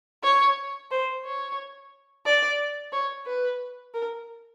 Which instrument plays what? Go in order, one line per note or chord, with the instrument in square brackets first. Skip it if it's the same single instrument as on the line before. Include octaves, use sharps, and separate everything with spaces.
[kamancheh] C#5
C5
C#5
D5
C#5
B4
A#4